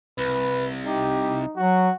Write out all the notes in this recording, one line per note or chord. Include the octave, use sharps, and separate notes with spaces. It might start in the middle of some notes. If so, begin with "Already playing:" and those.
C2 B4
D#4 G4
F#3 F#4